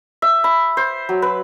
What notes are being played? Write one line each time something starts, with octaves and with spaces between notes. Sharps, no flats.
E5
B5
C5
F#3
B4